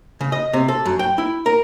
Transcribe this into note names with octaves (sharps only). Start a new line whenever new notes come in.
C#3
D#5
C3
A4
F#2
G5
E4
A#4